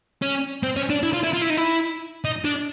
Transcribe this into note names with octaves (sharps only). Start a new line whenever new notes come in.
C#4
C4
C#4
D4
E4
F4
E4
F4
E4
D#4
E4
D#4
D4